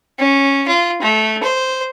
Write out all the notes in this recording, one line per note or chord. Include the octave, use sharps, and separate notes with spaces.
C#4
F4
A3
C5